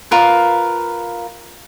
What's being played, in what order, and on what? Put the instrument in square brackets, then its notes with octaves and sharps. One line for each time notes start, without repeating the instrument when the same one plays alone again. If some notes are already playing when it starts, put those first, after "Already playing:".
[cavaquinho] F4 A#4 B4